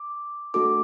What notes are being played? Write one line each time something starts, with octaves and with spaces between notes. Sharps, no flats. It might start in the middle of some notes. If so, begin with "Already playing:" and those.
Already playing: D6
A3 D4 F#4 A4 D6